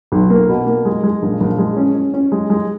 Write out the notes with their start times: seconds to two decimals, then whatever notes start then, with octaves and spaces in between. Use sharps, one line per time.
0.12 B1
0.30 A#3
0.49 B2
0.67 A#3
0.85 G#3
1.03 G#3
1.22 A#1
1.40 A#1
1.58 G#3
1.77 C#4
1.95 C#4
2.14 C#4
2.32 G#3
2.50 G#3